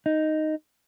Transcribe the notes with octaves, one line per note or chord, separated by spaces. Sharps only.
D#4